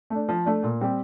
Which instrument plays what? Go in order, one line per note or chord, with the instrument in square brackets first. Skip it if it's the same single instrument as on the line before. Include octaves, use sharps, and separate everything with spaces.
[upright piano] A3 D4
F3
A3 D4
A#2
G3 C4 G4